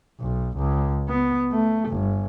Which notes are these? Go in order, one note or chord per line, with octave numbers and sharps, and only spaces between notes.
B1
C#2
B3
A3
G1